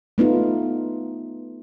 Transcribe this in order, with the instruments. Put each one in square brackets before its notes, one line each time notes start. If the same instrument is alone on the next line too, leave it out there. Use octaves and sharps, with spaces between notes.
[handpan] A3 B3 D#4 F4